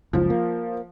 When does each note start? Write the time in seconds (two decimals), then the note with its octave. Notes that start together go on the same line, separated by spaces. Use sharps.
0.13 F#1 C#2 F3
0.30 A#3